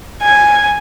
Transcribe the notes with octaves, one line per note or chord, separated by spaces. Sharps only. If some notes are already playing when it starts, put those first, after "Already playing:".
G#5